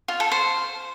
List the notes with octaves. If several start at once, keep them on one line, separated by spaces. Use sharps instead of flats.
F4
A4
C5